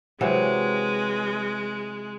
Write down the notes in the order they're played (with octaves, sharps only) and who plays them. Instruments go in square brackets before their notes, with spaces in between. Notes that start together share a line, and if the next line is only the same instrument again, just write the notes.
[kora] C3 E3 F#3 [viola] G#3